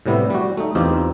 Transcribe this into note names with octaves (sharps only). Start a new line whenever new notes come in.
A2 C3 G3 B3 E4
G3 F#4
A3 D#4
E2 C4 D#4 F4 G4 C5